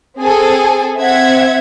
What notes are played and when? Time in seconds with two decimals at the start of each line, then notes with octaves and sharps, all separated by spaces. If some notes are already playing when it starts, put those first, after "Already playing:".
0.19 C4 G#4 A4 G#5
0.98 C4 E5 F#5 G#6